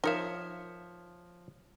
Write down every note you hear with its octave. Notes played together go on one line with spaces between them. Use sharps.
F3 D#4 A#4 C#5 E5 F5